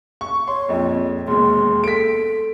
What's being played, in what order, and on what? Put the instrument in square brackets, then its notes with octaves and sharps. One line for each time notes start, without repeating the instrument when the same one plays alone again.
[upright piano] C#6
[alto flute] C#5 [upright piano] C6
[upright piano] A#1 F2
[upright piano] E1 D#2 B2 [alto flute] C6
[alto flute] A4 [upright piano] B6 D7